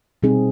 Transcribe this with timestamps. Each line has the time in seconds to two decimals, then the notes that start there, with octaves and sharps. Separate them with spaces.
0.23 B2 G3 C4 D#4 G#4